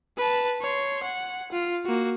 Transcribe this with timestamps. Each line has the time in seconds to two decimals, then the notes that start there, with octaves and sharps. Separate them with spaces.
0.17 B4 A5
0.61 C#5 C6
1.03 F#5
1.52 F4
1.85 A#3 F#4